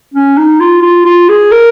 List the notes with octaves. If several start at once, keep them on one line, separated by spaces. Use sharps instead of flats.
C#4
D#4
F4
F4
F4
G#4
A#4